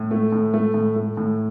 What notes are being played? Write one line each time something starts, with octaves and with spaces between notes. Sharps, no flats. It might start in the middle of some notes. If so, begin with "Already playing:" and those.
Already playing: A2
A3
A2
A3
A2
A3
A2